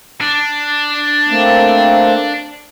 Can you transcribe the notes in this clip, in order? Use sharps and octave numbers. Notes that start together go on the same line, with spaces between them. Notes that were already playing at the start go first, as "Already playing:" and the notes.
D4
A3 A#3 C4